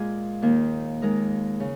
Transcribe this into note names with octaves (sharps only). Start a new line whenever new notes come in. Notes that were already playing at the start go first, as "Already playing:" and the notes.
Already playing: A#2 G#3 F4 G#4
D#2 D#3 A#3
D#3 G#3 D#4 A#4
C#3